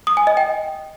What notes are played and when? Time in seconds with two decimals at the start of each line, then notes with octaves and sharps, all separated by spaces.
0.07 D#6
0.17 G#5
0.27 D#5
0.37 G5